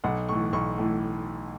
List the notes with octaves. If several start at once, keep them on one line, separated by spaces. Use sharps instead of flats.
B1 F#5
A2 E3 C#6
B1 C#6
A2 E3